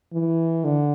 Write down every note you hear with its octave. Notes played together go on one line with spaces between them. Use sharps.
E3
D3